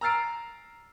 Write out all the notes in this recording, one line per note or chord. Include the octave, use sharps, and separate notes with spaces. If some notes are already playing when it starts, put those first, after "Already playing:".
A#5 E6 F6 A6 C7 D7